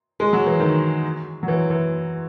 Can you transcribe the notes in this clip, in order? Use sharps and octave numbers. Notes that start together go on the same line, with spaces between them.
G#3
F#3
E3
D#3
F#3
E3
E3